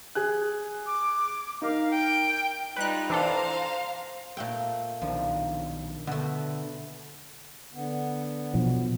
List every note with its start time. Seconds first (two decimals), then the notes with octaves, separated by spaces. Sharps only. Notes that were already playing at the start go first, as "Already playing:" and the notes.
0.15 G#4 G#5 F#6
0.86 D6
1.62 D#4 A#4 F5
1.91 G5
2.77 G3 D#4 F4 B4 F#6
3.10 E3 D4 A4 C5 F5 A#5
4.37 A#2 A3 G5
5.02 B1 D#3 F3 D4
6.07 B2 D3 A3
7.74 D3 B3
8.54 B2 F3 F#3